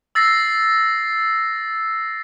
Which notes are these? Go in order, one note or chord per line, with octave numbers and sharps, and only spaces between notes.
E6 A6 A#6 C7